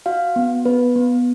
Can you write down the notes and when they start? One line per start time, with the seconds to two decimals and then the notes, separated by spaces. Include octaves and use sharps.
0.06 F#4 F5
0.36 B3
0.65 B3 B4
0.96 B3